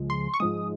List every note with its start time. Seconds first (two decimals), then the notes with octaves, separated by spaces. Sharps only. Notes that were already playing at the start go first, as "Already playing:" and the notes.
Already playing: C#2 C#3 F3 G#3
0.10 C6
0.34 C#6
0.40 G#2 F3 G#3 D#6